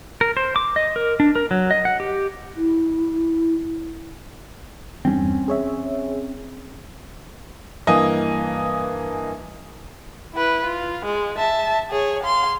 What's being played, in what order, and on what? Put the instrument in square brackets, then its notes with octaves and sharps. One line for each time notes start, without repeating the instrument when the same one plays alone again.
[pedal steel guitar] A#4
C5
D6
D#5
A#4
D4
A#4
F#3
D#5
F#5
G4
[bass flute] E4
[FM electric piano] E2 G2 [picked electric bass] C4 C#4
[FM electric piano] G#4 C#5 E5
[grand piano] G2 E3 A#3 D#5 G#5
[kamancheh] E4 B4
F4
G#3
E5 A5
G#4 C#5
F5 C6